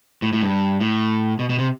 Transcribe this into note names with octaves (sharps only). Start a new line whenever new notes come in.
A2
A2
G2
A2
B2
B2
C3